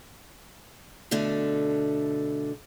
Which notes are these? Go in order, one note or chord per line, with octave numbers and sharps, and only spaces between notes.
B2 D3 A3 D4 A4